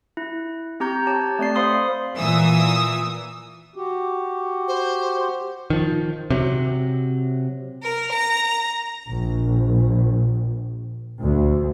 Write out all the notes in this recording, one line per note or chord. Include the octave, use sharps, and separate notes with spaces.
E4
C4 G4 A#5 G6
G4 C#5 A5 D6
A3 C4 D5 C7
C5 F5 B5 C6 D#6
A#2 E3 G#5 D#6 E6
F#4 G4
C5
D#3 F3
C3 F#3
A#4
A#5
A#1
D2